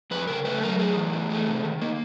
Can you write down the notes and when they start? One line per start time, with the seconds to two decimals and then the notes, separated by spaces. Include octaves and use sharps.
0.11 F2 B4
0.27 C#3 A#4
0.45 A3 B4
0.63 F#3 A#4
0.79 A2 G#4
0.96 E3
1.13 A2
1.30 A3
1.47 C3
1.65 D#3
1.81 A#3